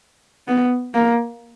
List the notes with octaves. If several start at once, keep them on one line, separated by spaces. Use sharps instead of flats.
B3
A#3